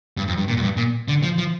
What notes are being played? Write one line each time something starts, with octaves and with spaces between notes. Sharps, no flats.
G2
F2
G2
A#2
F2
G2
A#2
D3
F3
F3